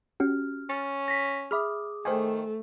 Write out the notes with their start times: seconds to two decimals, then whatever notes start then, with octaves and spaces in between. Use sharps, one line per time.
0.20 C#4 F#4 G4 F6
0.70 C#4 A6
1.08 A#6 B6
1.51 G#4 E5 B5 D6 D#6 F6
2.05 D#3 A3 C5 G5 G#5